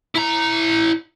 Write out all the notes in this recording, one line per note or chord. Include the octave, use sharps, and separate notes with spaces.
E4 A#5